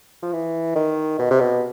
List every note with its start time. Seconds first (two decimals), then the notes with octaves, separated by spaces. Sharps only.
0.23 F3
0.33 E3
0.76 D#3
1.19 B2
1.31 C3
1.40 B2